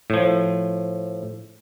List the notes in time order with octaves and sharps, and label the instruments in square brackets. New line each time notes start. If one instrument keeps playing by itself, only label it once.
[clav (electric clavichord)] A2 F3